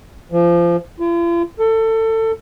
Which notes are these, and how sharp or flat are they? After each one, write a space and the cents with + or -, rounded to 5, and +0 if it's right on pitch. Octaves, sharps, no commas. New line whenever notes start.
F3 -25
F4 -45
A4 +25